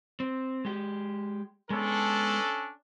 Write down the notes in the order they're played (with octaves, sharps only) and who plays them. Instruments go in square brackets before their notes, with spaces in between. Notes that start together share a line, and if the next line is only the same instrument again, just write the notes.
[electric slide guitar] C4
G#3 G4
[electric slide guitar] G#3 B3 [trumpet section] C#4 D4 A4